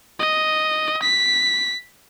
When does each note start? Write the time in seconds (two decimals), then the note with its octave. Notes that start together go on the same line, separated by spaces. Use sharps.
0.19 D#5
1.03 B6